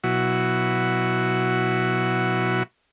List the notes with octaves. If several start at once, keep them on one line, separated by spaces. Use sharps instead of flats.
B2 F#3 E4 F#4